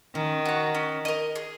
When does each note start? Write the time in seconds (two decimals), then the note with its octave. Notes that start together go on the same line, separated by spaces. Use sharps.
0.15 D#3 C#4
0.45 F#4 C#5
0.75 C#4
1.05 A#4 D#5
1.36 G#4